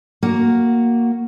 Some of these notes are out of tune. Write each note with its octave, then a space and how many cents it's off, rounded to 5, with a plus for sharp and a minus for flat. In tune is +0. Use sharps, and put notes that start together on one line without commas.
A#3 +0 F#4 +0